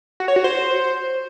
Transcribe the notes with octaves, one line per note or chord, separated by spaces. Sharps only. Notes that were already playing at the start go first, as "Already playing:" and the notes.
F#4
C#5
F#4
C5